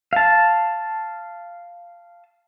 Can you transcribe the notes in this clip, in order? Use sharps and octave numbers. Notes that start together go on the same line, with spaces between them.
F5 A5